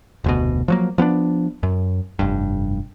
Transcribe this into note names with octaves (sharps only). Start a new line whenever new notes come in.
F1 D2 B2
F3 F#3 A#3
F3 B3 C#4 D4
F#2
F1 G2